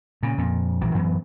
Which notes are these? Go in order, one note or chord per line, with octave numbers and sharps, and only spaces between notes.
A#2 C#3
F2 A#2
A#1 E3 F#3
F#2 E3 F#3 B3